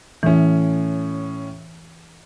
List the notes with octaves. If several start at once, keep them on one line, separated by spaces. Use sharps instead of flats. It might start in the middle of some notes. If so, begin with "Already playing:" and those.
A2 E3 C#4